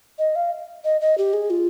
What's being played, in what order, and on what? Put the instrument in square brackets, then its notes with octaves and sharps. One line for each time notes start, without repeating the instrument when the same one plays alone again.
[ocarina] D#5
F5
D#5
D#5
G4
G#4
F4